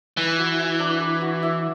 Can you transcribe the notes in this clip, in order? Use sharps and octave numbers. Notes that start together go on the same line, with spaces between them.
E3 B4
F#4
E5
D4
B4
F#4
E5